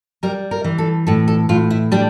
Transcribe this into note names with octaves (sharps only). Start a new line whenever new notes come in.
G3 A#4
A#4
E3
A4
A2 A4
A4
A2 F4
E4
G3 D4